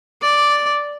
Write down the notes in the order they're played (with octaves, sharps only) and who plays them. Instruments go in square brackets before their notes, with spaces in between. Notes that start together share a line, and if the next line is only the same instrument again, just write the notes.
[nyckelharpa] D5